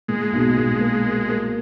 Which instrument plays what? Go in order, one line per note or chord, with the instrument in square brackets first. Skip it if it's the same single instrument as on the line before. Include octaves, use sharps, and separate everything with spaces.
[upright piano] A#2 [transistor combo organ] G#3
[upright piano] B1
A#2
A#3
A#3
A#3